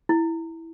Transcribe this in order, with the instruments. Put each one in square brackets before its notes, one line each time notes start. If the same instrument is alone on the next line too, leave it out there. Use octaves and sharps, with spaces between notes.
[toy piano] E4